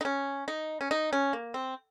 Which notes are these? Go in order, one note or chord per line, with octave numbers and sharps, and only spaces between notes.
D#4
C#4
D#4
C#4
D#4
C#4
A#3
C4